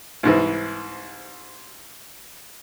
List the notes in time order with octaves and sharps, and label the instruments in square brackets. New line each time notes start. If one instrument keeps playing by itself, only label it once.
[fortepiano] C2 G#2 E3